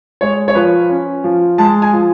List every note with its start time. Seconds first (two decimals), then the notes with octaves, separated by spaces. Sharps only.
0.21 G#3 C#5
0.48 C#5
0.55 F3 B4
0.90 C#4
1.24 F3
1.58 G#3 A5
1.82 G#5
1.93 F3